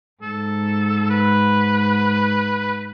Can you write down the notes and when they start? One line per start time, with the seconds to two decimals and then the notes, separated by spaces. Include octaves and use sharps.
0.22 G#2 A4
1.10 B4